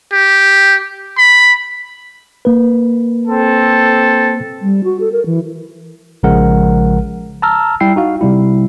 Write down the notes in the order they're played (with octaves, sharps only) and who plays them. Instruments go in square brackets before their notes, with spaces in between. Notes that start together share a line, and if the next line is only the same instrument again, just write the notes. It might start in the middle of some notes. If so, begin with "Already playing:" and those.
[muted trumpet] G4
B5
[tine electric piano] A#3 B4
[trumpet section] C4 A4
[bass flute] G3
F#4
A4
A#4
E3
[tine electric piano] A#1 C#3 F3 G#3 A#4 F#5
A5 A#5 E6 F6
G3 E4 G5 C7
D#4 F#4 F5
C3 G3 E4